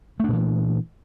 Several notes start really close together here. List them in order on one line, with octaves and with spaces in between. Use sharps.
A3 D4 A#2 E3